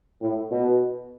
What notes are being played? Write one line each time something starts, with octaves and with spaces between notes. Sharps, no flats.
A2
B2